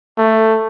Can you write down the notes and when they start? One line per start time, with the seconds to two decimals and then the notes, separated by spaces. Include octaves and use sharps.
0.18 A3